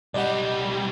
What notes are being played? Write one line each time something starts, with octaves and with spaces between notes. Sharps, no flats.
B1 G3 D5 D#5 F#5